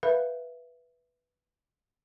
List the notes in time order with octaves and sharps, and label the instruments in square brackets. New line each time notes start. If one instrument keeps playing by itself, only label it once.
[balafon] A#4 B4 E5 F5 B5